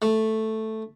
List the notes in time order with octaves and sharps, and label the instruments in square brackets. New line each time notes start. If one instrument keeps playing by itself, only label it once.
[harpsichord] A3